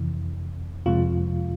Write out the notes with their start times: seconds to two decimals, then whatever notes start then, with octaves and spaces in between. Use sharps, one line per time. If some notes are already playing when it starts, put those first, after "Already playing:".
Already playing: F2 C3 E3
0.86 F2 C3 F3 G#3 F4